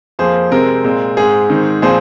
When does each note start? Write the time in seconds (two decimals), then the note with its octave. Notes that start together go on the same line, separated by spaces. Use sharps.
0.19 F2 F3 A#3 G#4 C5
0.51 C3 G#3 C4 A#4
0.84 A#2 G#3 C4
1.17 G#2 G#3 C4 G#4
1.50 G#2 D#3 C4
1.82 A#2 F3 C4 G#4 C5